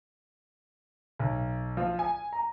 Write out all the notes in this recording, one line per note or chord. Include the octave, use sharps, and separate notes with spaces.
B1
F3
G#5
A#5